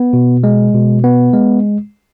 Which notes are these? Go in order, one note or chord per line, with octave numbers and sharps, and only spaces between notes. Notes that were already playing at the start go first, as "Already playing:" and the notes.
Already playing: B3
B2
G#3
B2
B3
G#3